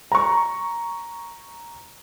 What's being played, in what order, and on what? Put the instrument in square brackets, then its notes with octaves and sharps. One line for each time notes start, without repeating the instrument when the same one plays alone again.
[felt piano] A#5 C#6